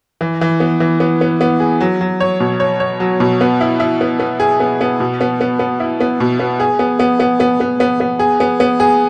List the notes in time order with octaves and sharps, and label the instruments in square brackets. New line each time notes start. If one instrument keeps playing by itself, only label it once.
[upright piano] E3
E3
B3
E3
B3
B3
B3
G#4
F#3
F#3
C#5
B2
C#5
C#5
F#3
B2
B3
E4
E4
B3
B3
G#4
B3
B3
B2
B3
B3
B3
E4
B3
B2
B3
G#4
B3
B3
B3
B3
B3
B3
B3
G#4
B3
B3
G#4